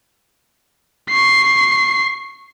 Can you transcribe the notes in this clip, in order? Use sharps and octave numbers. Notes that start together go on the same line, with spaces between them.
C#6 C7